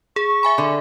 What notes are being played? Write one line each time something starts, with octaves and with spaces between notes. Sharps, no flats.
G#4 C#6
E5 G#5 B5
D3